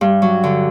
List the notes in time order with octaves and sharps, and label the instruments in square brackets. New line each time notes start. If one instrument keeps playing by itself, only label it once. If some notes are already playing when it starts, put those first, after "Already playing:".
[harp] G2
F#3
D3